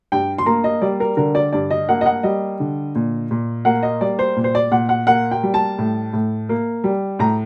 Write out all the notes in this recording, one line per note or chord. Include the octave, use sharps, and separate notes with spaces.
G2 G5
C6
A#3 A#5
D#5
G3 D5
A#4
D3 A#4
D5
G2 D5
D#5
A#3 F#5
D#5
F#5
G3 D#5
D3
A#2
A#2
A#3 F#5
D#5
G3 D5
C5
A#2
C5
D5
A#2 F#5
F#5
A#3 F#5
G5
G3
A5
A2
A2
A#3
G3
A2 A#5